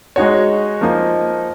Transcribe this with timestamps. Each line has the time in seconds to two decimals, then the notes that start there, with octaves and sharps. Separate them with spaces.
0.16 G#3 D#4 F#4 C#5
0.81 F3 A#3 D#4